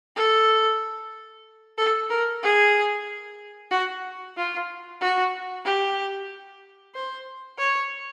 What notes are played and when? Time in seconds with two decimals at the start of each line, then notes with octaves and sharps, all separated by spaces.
0.16 A4
1.78 A4
2.10 A#4
2.43 G#4
3.71 F#4
4.37 F4
5.01 F#4
5.65 G4
6.95 C5
7.58 C#5